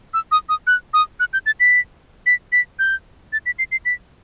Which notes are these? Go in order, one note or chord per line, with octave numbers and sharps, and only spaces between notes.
E6
D#6
D#6
F#6
D#6
F#6
G6
A6
B6
B6
B6
G6
A6
B6
C7
C7
B6